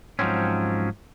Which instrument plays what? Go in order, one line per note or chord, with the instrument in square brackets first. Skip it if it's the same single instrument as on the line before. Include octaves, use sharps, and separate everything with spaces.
[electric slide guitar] G#2 F3 F#3 C4 C#4